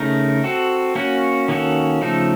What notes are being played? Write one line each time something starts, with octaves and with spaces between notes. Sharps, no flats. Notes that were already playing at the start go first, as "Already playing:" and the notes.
Already playing: C#3 A3 D#4 A#4
C4 F#4 A4
A#3 C#4 F#4
D#3 A#3 C#4 F#4 A4
C#3 F3 A3 D#4 A4